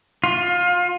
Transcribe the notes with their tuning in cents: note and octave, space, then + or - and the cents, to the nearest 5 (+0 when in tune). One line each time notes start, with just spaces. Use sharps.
F4 +25